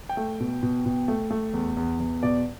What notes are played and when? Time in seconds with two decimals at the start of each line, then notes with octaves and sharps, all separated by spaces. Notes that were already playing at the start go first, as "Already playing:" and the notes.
0.09 G5
0.17 A3
0.40 B2
0.63 B2
0.86 B2
1.08 A3
1.31 A3
1.54 E2
1.77 E2
2.00 E2
2.23 B2 D5